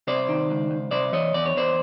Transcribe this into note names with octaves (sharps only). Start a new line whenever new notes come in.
C3 C5 D5
D#3
C#2
C#2
C3 C5 D5
E3 C#5 D#5
E2 D5
C#5
E2 C5 D5